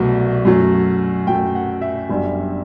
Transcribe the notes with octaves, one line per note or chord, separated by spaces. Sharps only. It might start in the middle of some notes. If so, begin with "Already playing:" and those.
Already playing: C2 B2 F#3 A3
F#2 F#3 A3
F#2 F#3 A3 G5
F#5
E5
G1 F#2 D3 G3